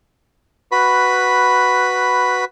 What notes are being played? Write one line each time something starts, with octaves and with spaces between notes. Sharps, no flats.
F#4 B4 B5